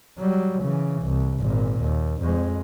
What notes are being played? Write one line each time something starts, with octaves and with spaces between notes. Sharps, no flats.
F#3 G3
C#3 E3
C2
G#1 A#2
D#2
F2 G#3